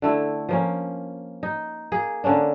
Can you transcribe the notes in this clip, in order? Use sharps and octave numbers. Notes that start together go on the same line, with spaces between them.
D3 A3 E4
F3 A#3 C#4
D#4
A#3 G#4
D3 A#3 C#4 D4